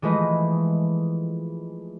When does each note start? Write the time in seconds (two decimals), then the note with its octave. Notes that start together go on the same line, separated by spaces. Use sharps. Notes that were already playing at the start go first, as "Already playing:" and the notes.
0.02 E3 F3 G#3 A3 B4 D#5